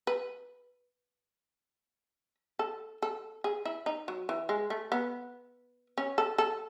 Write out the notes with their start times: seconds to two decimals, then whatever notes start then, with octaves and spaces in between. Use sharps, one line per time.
0.07 B4
2.59 A4
3.02 A4
3.44 G#4
3.65 E4
3.86 D#4
4.08 F#3
4.29 E3
4.49 G#3
4.70 A3
4.92 B3
5.98 C#4
6.18 A4
6.38 A4